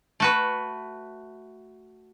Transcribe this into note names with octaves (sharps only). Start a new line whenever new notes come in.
A3 F#4 B4